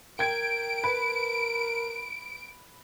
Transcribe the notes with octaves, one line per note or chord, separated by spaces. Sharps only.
A#4 G5 G#6 D7
B4